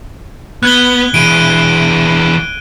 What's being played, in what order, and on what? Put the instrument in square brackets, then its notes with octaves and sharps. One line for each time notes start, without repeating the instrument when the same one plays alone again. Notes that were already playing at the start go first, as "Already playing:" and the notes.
[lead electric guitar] B3 [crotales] F#6 G#6 G7
[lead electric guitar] E3 G#3 [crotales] D7 D#7